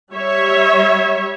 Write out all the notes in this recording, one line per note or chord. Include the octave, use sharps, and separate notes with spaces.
G3 C#5 E5